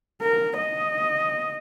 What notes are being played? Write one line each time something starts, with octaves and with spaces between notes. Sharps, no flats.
A#4
D#5